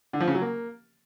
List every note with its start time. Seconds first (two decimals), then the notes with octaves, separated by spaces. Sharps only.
0.13 D3
0.20 F3
0.28 C#3
0.35 F#3
0.42 A#3